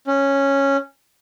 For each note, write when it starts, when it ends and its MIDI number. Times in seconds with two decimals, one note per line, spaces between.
0.07 0.77 61